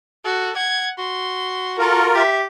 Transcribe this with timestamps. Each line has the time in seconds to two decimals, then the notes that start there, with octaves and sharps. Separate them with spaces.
0.25 F#4 A4
0.56 F#5 G#6
0.99 F#4 C6
1.79 F4 A4 A#4
2.15 G4 E5